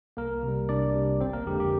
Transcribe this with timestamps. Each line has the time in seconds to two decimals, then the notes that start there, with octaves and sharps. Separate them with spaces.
0.17 C2 A#3 A#4
0.43 C3
0.48 G3
0.69 C2 D4 D5
0.95 C3 G3
1.20 G1 C4 C5
1.33 A#3 A#4
1.46 F2 D3 G#3 G4
1.60 G4